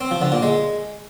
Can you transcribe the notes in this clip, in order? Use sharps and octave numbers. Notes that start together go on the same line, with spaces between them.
C4
F3
D3
A#2
G#3